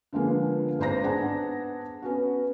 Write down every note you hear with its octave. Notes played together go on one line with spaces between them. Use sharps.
D3 F3 G#3 A#3 B3
G#1 B4 C5 D5 A#5 A#6
B3 D4 G#4 F#5 A5
B3 C#4 F#4